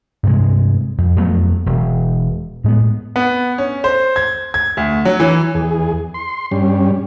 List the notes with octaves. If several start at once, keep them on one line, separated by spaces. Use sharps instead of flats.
G2 C3 G#3
F2
F2 F#3 A3 B3
E1
A2 G#3 B3
B3
C#4
C5
G#6
G#6
D2
F#3
E3
E2 G#4
C6
G2 G3 C#4